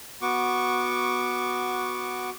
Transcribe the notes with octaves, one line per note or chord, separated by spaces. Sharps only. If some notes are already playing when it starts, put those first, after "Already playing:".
B3 F#4 C#6 D6